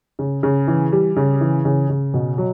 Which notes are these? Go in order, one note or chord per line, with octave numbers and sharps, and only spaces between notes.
C#3
C#3
E3
G3
C#3
E3
C#3
C#3
B2
F#3